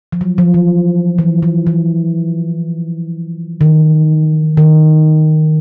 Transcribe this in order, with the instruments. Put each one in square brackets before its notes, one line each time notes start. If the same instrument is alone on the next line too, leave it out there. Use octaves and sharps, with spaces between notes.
[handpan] F3
F#3
F3
E3
E3
E3
E3
D#3
D#3